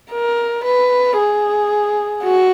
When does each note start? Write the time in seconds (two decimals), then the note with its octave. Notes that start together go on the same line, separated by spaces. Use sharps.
0.11 A#4
0.65 B4
1.17 G#4
2.23 F#4